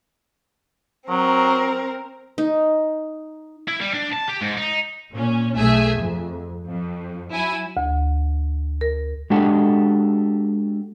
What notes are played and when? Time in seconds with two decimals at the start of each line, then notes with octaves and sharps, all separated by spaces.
1.09 F#3 C4 A#4
2.38 D#4
3.68 E4
3.81 G3
3.94 D4
4.12 A5
4.28 G4
4.41 G#2
4.57 D#4
5.12 A#2 C#4
5.56 B1 A3 G#4 E5 G#5
5.98 F2
6.67 F2
7.30 F#3 E4 G#5
7.77 D2
8.81 A#4
9.30 G#3 D4 F#4 G4 A4 F#5